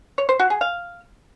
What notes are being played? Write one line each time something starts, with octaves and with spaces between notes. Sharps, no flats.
C#5
C5
F#4
G#4
F5